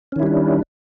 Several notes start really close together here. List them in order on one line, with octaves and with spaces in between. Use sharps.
C#4 D#3 E4 G3 D4